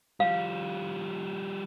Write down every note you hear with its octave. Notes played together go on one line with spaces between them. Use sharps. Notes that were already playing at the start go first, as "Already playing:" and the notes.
F3 G3 F5